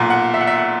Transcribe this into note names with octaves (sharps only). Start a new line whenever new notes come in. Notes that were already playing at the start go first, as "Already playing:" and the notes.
Already playing: B1 A#2 F#5
F#5
E5
F#5
E5
F#5